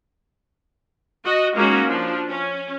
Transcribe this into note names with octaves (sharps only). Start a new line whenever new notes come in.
F#4 D#5
G#3 A#3 C#4 D#4 F#4
F3 D4
C#4